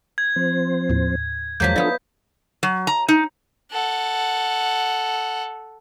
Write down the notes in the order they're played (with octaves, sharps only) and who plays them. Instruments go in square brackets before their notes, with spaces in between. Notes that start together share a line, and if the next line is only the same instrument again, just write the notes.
[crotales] G#6
[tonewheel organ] F3 C4 C5
[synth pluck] D#2 A2
[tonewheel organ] E2 G#3 [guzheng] F3 F#3 A#3 [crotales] G6 B6
[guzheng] B3 E4 [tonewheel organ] D4 F4 A4 [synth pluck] D5 F5 D#6
[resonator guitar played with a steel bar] F#3
A#5
D#4
[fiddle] A4 F#5